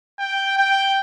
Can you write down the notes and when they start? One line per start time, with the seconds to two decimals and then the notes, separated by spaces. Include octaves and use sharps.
0.19 G5
0.58 G5